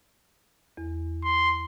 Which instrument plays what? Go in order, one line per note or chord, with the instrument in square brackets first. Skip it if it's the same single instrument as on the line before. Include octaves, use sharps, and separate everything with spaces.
[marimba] E2
[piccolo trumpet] C6